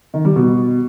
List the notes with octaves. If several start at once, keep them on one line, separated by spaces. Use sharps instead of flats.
D#3
G3
B2